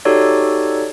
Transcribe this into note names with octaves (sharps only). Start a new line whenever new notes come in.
D#4 F#4 G4 A4 C#5 D5